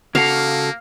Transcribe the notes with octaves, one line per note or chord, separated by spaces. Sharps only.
C#3 A#3 F#4 A4 F5